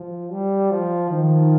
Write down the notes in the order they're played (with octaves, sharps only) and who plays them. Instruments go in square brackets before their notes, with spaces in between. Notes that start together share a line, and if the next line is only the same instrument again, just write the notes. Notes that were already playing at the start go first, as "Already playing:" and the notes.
Already playing: [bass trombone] F3
G3
F3
[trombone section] D#3 [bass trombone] F3